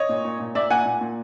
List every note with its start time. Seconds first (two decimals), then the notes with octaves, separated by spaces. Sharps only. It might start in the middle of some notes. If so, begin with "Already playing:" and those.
Already playing: C#5 D#5
0.09 A#2
0.25 A#2
0.40 A#2
0.55 A#2 D5 E5
0.70 A#2 F#5 G#5
0.86 A#2
1.01 A#2